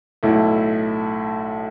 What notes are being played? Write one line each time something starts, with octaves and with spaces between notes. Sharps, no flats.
B1 A2 A3 E4